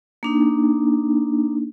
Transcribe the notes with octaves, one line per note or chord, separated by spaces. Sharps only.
A#3 D4 D#4